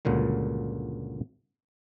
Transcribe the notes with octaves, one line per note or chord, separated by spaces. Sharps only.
C#2 G2 A#2 D3 F#3